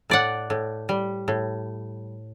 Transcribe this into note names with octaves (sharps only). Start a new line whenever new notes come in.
A2 D5 F#5
A2
G3
A2